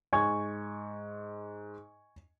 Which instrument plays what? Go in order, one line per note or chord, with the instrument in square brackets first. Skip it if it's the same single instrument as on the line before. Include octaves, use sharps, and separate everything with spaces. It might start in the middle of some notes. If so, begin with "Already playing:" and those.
[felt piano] G#2 [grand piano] G#5 C#6 G#6